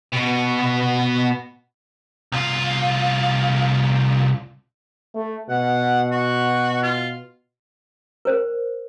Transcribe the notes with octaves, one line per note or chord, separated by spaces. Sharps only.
B2 B3
C2 F4
A3
B2 F#5
F#4
F4
A#4 C5